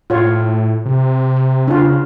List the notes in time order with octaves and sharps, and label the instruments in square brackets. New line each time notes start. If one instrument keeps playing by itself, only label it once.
[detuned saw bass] A2 [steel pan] F4 C#5
[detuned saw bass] C3
[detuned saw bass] C#3 [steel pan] D4 F4